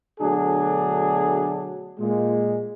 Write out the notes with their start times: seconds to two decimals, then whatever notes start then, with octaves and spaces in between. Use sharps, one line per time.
0.20 B2 D3 F#3 A3 D4 G#4
1.99 A#2 G#3